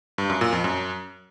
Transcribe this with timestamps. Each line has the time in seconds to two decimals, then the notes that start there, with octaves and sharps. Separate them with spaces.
0.18 G2
0.30 F#2
0.41 A#2
0.53 F2
0.64 F#2